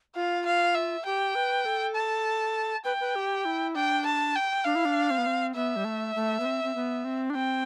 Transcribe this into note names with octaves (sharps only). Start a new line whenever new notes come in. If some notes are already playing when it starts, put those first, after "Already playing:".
F4 F5
F5
E5
G4 G5
B4
A4
A5
B4 G5
B4
G4
E4
D4 G5
A5
G5
D4 F5
E4
D4
C4
B3
C4
B3 E5
G3
A3
A3
B3
C4
C4
B3
C4
D4
C4 G5